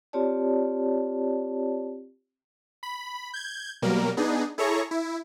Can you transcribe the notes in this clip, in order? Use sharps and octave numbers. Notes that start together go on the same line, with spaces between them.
C4 F4 G4 C#5 D5 A5
B5
G6 G#6
B2 F#3 G3 A#3 A#4
B3 D4 D#4 G#4
E4 G#4 A4 C#5 A#5 C#6
E4